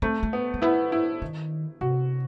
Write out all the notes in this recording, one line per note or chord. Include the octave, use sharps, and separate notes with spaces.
A3 C4
A3
B3
A3
B3 E4
E4
D#3
C3 F#4